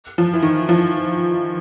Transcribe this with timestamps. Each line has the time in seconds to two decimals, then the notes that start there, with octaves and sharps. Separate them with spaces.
0.18 F3
0.33 E3
0.43 D#3
0.69 F3